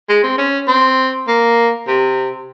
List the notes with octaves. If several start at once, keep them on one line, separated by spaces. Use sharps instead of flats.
G#3
C4
C#4
C4
A#3
C3